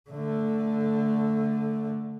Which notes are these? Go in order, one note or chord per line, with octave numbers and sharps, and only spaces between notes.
D3 A3